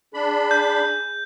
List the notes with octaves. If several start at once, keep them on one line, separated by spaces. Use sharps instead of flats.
D4 G#4 B5
G6